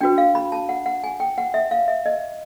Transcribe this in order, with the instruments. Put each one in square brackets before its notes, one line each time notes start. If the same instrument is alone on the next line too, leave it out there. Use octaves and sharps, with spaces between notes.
[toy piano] D4 F#4 B4 G5
F5
B5
A5
F#5
F#5
G#5
G5
F#5
E5
F5
E5
D#5